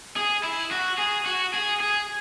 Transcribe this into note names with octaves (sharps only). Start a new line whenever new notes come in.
G#4
E4
F#4
G#4
F#4
G#4
G#4